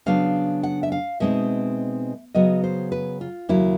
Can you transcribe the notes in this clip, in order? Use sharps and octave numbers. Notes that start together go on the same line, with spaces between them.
C#3 F#3 B3 D4 F5
F#5
E5
F5
B2 G#3 C4 D#4 E5
C#3 F#3 B3 D#5
C5
B4
F4
D#2 C#3 F#3 E4